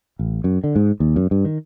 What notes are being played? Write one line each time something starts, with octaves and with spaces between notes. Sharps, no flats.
A1
F#2
D3
G#2
D#2
F#2
G2
D#3